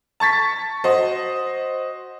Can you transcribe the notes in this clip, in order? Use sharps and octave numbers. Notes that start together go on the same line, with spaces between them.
A5 C#6 A6 B6
F#4 C5 D#5